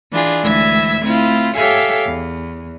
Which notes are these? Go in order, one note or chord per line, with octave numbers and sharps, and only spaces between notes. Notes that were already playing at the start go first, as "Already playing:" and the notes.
E3 D4 F4 G#4
D2 E3 G#3 E5 E6 G#6
A3 C4 E4 F4
G4 A4 C#5 E5 F5 G#5
E2